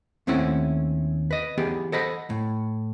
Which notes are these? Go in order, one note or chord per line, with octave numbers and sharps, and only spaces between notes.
D#2 A3 C4 C#4 E4 F#5
B4 D#5
E3 B3 G4 G#4
A4 C5 D#5 F#5 B5
A2